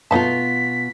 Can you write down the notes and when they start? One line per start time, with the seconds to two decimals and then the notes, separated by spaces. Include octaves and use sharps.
0.11 B2 A3 B3 D#4 F4 A5 B6